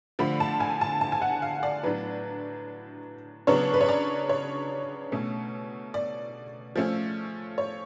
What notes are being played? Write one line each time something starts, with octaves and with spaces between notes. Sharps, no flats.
D3 F3 A3 B5
A5
G#5
A5
A5
G#5
F#5
F5
D5
A2 F#3 B3 D4 B4
C#3 F#3 B3 D4 C#5
B4
C#5
D5
C#5
B2 A3 C#4
D5
F3 A3 C#4
C#5